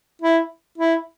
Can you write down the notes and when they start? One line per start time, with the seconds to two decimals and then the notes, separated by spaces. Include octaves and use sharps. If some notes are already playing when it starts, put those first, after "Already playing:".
0.22 E4
0.78 E4